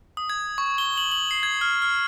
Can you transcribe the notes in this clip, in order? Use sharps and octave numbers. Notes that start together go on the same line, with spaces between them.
D#6
G#6
C#6
G7
F#7
F#7
C7
G#6
F6
F6